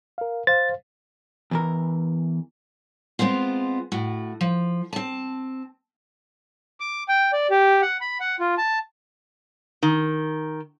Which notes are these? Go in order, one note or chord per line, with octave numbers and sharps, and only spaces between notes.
A#4 F5
C5 F5 A6
E2 E3 A#4
G#3 B3 C4 F4
A2 F#4
F3
C4 A5
D6
G5
D5
G4
F#5
B5
F#5
F4
A5
D#3